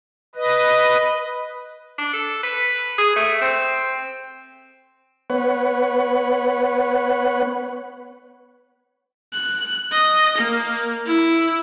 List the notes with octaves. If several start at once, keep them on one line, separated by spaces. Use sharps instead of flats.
B4 D#5
D4
A4
B4
G#4
A3
C4
B3 B4 C#5 F#5
F#6
D#5
A#3
E4